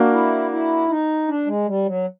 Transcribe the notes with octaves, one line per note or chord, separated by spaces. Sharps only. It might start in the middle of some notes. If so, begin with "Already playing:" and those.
Already playing: A#3 D4 F#4 A#4
E4
E4
D#4
D4
G#3
G3
F#3